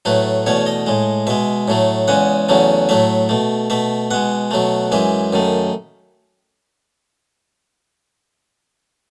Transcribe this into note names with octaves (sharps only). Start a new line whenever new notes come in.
A2 F#3 A3 B4
E2 B2 A3 C#5
D#5
A2 G#3
B2 G#3 E5
A2 F#3 A3
E2 C#3 G#3 F#5
E2 C#3 F#3 A3
A2 F#3 A3 E5
B2 A3
B2 A3 E5
B2 G#3 F#5
B2 F#3 A3
F#2 E3 G#3 E5
F#2 D#3 A3